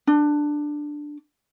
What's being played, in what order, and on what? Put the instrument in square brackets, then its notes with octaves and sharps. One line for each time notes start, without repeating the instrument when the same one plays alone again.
[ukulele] D4